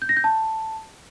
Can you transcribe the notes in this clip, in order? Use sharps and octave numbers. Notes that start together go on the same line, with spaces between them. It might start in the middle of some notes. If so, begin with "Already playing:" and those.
G6
A#6
G6
A5